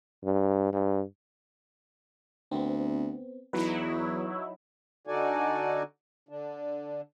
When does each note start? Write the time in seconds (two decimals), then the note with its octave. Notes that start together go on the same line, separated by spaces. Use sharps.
0.24 G2
0.73 G2
2.52 D2 B3 C4
3.53 E2 F#3 D#4 E4 B4
5.07 D3 D#4 F#4 A4 D5 G#5
6.29 D3 D4